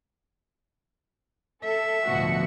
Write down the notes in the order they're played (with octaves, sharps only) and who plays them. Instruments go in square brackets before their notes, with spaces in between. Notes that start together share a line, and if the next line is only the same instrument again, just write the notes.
[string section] A4 [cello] E5
[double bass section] A1 D2 F3 [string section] B2 F#4 C#7